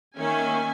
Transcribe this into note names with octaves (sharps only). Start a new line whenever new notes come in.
D#3 A#3 C#4 E5 G#5